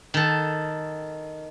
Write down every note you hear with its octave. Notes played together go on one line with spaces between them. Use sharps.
D#3 A4